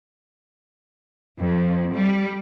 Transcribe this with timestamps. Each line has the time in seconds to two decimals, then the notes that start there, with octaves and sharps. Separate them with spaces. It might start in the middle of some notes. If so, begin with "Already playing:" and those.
1.39 F2
1.95 G3